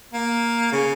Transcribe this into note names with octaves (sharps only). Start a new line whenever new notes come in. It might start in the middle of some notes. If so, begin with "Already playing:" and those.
A#3
C#3